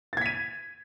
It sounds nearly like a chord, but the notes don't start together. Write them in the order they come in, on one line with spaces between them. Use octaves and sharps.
A6 G#6 B6 D#7